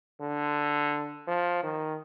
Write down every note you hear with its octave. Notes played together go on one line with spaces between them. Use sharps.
D3
F3
D#3